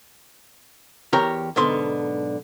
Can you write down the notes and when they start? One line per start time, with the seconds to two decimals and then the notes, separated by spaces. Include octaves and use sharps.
1.13 E2 G4 A#4 C#5 G5 A#5
1.56 B1 G#2 D3 B3 C6